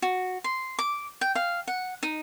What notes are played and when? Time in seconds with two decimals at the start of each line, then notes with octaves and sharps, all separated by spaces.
0.02 F#4
0.44 C6
0.79 D6
1.21 G5
1.35 F5
1.68 F#5
2.03 D#4